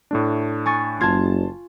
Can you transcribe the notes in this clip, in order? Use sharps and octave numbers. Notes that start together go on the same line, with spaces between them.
A2 A3 D4
G#5 C#6 A6
F#1 F4 A5 C6 G#6